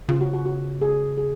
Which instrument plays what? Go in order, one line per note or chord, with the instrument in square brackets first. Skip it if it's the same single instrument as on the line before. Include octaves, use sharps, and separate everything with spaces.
[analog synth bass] C#3 [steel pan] F4
[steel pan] F#4
F#4
F#4
G#4
G#4